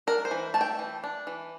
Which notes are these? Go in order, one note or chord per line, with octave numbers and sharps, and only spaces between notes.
D4 A#4
C5
E3
A3 A5
G5
E3
D4
E3